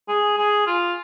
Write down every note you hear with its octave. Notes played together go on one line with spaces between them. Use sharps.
G#4
G#4
F4